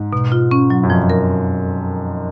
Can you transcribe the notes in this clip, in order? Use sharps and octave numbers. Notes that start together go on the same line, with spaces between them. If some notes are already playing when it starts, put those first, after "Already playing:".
Already playing: G#2
B2
F4
C#4
F#3
F#2
F2 F3
A#4